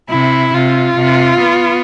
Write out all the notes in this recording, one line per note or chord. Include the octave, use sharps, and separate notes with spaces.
C3 E4
C3 F4
C3
B3